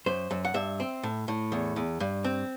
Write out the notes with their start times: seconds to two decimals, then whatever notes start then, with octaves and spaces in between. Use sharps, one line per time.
0.06 F#2 C5
0.31 F#2
0.45 F#5
0.54 G2 E5
0.80 C4
1.03 A2
1.28 A2
1.52 E2
1.76 E2
2.00 G2
2.24 C4